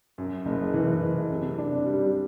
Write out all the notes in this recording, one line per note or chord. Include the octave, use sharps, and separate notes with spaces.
F#2
F#1
E3
F#1
C3
D4
G3